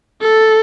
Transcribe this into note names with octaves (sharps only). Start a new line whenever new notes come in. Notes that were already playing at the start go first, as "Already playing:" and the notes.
A4